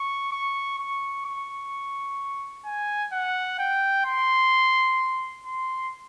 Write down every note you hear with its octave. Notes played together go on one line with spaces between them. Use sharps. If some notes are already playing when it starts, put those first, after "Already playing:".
Already playing: C#6
C#6
C#6
C#6
G#5
F#5
G5
C6
C6